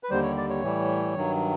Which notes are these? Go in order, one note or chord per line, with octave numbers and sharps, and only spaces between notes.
B4
D#2 D3 G3 C5
C#5
D5
C#5
A2 E3 G3
G2 D#3 F#3